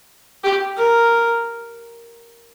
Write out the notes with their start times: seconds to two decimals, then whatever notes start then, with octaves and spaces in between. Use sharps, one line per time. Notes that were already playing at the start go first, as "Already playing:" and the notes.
0.44 G4
0.77 A#4